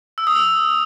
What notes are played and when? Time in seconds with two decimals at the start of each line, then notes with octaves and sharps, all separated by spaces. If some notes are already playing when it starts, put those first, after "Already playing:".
0.18 E6
0.27 D#6
0.35 E6